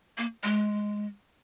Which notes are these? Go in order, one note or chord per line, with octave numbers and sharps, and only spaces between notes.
A#3
G#3